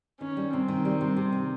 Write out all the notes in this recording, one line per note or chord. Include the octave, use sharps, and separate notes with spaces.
D#3 C#4
G3
C3 C4
D#3
G3
C3
C3
D#3